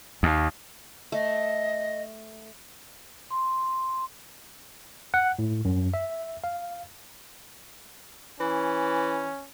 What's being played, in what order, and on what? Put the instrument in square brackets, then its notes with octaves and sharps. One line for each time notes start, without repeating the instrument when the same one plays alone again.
[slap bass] D#2
[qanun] A3 [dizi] D#5
[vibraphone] C6
[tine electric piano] F#5
A2
F#2
E5
F5
[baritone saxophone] E3 [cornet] C#4